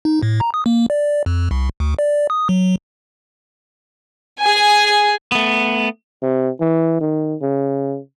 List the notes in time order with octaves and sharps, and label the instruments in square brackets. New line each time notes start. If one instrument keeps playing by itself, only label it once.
[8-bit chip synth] D#4
A2
A#5
D#6
A#3
D5
F2
C2
D2
D5
D#6
F#3
[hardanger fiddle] G#4 G#5
[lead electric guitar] A3 B3
[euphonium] C3
E3
D#3
C#3